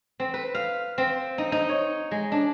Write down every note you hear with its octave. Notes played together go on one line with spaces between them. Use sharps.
C4
B4
F5
C4
D#4
D#4
C#5
G#3
D4